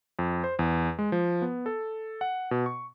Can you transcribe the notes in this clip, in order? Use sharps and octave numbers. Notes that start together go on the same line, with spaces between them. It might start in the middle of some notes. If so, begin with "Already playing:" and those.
F2
C5
E2
G#3
F3
B3
A4
F#5
B2
C#6